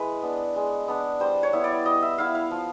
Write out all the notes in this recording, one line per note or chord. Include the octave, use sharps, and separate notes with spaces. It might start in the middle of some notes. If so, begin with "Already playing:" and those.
Already playing: G#3 E4 B4
B3 D4
G#3
B3 D4
G3 C5
C#5
B3 E4
D5
G3 D#5
E5
B3 E4 F5
F5
F3